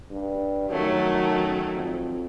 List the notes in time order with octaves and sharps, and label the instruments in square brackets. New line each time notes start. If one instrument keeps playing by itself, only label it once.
[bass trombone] G2
[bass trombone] F#2 [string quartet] D#3 F#3 A3
[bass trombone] F2